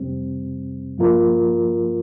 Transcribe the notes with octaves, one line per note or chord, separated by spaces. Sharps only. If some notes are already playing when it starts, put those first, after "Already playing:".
Already playing: F2 C3 G3 C4
G2 F3 A#3 F4 A#4